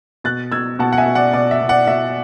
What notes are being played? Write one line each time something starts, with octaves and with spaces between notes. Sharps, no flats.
B2 F#6 A6
B2 E6 G#6
B2 F#5 A5
F#5
E5 G#5
B2
D5 F#5
B2 D5
E5
B2
D5 F#5
B2 E5